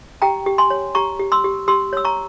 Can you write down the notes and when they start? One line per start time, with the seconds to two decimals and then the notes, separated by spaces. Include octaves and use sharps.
0.22 G4 G5 A#5
0.46 G4
0.58 G#5 C6
0.70 C#5
0.95 G4 A#5 C#6
1.19 G4
1.32 C6 E6
1.44 G4
1.68 G4 C6 E6
1.93 C#5 E6
2.04 A#5 C#6